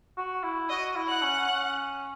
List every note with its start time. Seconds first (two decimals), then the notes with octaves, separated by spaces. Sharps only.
0.17 F#4
0.44 E4
0.70 F#4 D#5 D#6
0.96 E4
1.09 F#5 F#6
1.22 C#4
1.49 C#4